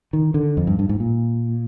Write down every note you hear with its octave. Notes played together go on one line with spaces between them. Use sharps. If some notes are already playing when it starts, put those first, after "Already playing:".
D#3
D3
F2
G2
G2
G#2
A#2